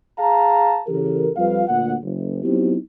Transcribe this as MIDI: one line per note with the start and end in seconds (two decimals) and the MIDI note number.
0.18 0.79 68
0.18 0.79 77
0.18 0.79 81
0.18 0.79 82
0.87 1.29 49
0.87 1.29 52
0.87 1.29 67
0.87 1.29 69
0.87 1.29 70
1.37 1.63 41
1.37 1.63 55
1.37 1.63 65
1.37 1.63 71
1.37 1.63 77
1.68 1.94 38
1.68 1.94 46
1.68 1.94 78
2.02 2.42 30
2.44 2.75 54
2.44 2.75 59
2.44 2.75 60
2.44 2.75 63
2.44 2.75 64
2.44 2.75 67